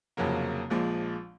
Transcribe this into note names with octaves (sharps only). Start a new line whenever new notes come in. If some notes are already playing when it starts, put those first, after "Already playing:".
F1 F2 C#3 F#3 A#3
A#1 A#2 F3 G#3